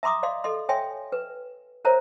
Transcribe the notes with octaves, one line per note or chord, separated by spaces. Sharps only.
E5 A#5 C6 D6 D#6
D5 D#5 F5 C6
A4 D#5 C6
C#5 E5 G5 G#5 C6
B4
A#4 C5 C#5 E5 A#5